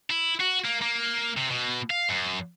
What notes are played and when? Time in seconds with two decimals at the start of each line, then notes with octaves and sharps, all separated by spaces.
0.10 E4
0.41 F#4
0.65 A#3
0.82 A#3
1.37 C3
1.51 B2
1.90 F5
2.09 F#2